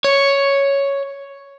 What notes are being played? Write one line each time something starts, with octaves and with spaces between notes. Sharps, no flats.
C#5